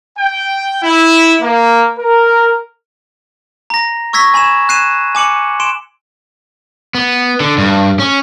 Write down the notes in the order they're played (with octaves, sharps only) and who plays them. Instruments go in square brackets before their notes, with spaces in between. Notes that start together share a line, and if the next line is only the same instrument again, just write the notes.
[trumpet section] G5
E4
A#3
A#4
[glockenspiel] A#5 A#6
C#6 E6 G#6 A#6 B6
G#5 B5 G#6 E7
F#6 G#6 C7 D#7 E7
G#5 D6 C#7 F#7
C6 D7 E7
[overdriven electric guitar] B3
D3
G2
C#4